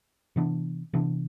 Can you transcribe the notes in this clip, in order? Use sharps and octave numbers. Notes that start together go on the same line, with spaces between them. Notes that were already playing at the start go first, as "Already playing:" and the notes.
C3 E3 B3 D4
C3 E3 B3 D4